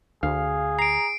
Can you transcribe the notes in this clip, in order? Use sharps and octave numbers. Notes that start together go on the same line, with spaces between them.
D2 G#4 F5
A#5 C7 D7